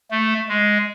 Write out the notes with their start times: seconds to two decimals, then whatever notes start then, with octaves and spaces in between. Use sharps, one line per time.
0.11 A3
0.49 G#3